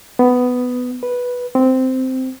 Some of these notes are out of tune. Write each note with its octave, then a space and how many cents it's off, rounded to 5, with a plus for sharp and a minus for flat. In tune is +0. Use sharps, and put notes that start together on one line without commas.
B3 +10
B4 -5
C4 -10